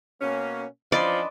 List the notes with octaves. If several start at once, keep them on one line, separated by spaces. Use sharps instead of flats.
B2 A#3 C#4
E3 F3 C#4 D4 D5 D#5 B5 C6